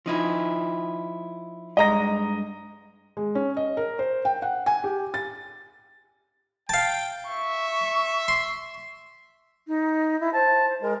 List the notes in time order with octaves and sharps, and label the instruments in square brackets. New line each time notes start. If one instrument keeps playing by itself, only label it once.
[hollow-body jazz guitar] F3 D#4 E4
[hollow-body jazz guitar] G2 G#3 [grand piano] D#5 A#5 A#6
[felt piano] G#3
C#4
D#5
A#4
C5
G5
F#5
G#5
G4
A6
[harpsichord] F5 A5 [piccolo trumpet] G5
[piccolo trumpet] E5 [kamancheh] C#6
[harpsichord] C6
[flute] D#4
E4
[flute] C5 [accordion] A5
[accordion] G#3 [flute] A#4